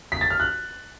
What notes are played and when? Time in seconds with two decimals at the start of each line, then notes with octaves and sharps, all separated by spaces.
0.12 B6
0.21 A6
0.30 F6
0.40 F#6